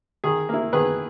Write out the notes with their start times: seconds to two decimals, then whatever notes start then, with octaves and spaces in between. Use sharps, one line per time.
0.24 D#3 G#4
0.49 A#3 E4
0.73 D#3 G#4 B4